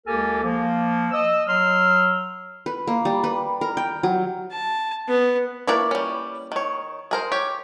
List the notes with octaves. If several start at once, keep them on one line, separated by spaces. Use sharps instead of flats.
C#2 A#3 G4 A4 A#4 G#5
F3 A#3
D#5 E6
F#3 C6 E6 F6
B4
A#3
G3
B4
A#4
G5
F#3
A5
B3
A#3 E4 B4 C#5 D5
G3 C#4
D#3 C#5
G#4 A#4 C5
G4 C#5